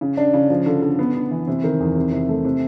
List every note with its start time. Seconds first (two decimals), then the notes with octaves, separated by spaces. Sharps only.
0.01 C#3
0.17 D4
0.34 C#3
0.50 F3
0.66 D3
0.82 D3
0.99 B3
1.15 B3
1.31 E3
1.48 C3
1.64 D#3
1.80 E2
1.96 C3
2.12 C3
2.29 A3
2.45 C3